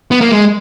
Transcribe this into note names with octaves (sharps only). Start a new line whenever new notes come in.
B3
A#3
G#3